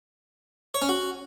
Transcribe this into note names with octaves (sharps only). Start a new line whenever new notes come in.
C#5
C#4
F#4